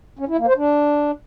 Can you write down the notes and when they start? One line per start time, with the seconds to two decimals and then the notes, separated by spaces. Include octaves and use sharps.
0.19 C#4
0.28 E4
0.38 A#3
0.47 C5
0.57 D4